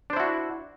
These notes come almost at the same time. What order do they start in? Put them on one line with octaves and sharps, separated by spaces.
D4 C5 E4 F#4